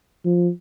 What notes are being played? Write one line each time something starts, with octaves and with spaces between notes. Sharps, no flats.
F3